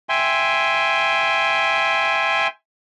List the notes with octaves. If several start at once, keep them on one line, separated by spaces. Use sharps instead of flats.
E5 G5 G#5 C6